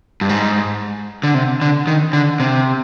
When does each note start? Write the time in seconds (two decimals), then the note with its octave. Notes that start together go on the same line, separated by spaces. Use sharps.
0.21 G2
0.29 G#2
1.23 D3
1.34 C3
1.61 D3
1.87 D#3
2.13 D3
2.40 C3